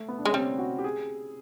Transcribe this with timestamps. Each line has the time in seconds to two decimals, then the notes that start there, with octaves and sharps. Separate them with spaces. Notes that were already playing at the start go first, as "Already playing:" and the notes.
Already playing: A3
0.08 B3
0.18 D4
0.25 G#3 C#4
0.33 G3 C4
0.58 F#4
0.79 G4
0.84 G#4